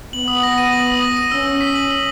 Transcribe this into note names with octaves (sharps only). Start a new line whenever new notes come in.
B3 F#7
D#6
A#6
D#7
F#7
D#6
A#6
D#7
C#4 E6
E6
B6
F#7
E6